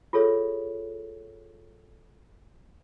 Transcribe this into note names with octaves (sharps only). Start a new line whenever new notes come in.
F4 G#4 A4 C#5 E5